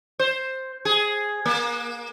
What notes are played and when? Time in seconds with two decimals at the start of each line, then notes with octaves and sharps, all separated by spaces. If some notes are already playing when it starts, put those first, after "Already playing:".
0.19 C5
0.85 G#4
1.46 A#3